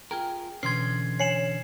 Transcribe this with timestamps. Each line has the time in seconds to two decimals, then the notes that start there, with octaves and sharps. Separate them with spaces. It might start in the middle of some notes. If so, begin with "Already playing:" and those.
0.11 F4 G#4 A#4 G5
0.63 B2 D3 E3 C#4 C6 G#6 C7
1.20 C#5 G#5 C7 C#7 E7 F#7